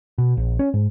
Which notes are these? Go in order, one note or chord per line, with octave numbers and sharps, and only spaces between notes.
B2
A#1
C#4
G#2